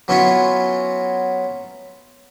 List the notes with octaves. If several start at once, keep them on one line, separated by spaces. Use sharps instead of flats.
F#3 B3 C#4 E4 F4